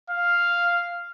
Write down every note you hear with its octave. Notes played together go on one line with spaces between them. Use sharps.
F5